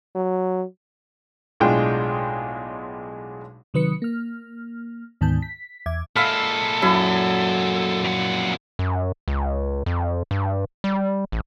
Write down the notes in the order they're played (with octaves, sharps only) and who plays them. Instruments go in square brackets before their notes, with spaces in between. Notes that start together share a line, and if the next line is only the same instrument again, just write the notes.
[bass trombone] F#3
[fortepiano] B1 A2 G#3 D4 F4 G5
[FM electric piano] C3 D#3 F#3 B4 D#6 C#7
A#3 F6
D2 G#2 D#3 B3 A5 G6
B6
E2 E5 D6 G#6
[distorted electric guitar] A#2 G#3 [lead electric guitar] A4 [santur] E5 F5 B5 [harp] F6
[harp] F#2 [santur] E4
[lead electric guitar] F2 F#5
[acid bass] F#2
C#2
F2
G2
G3
A1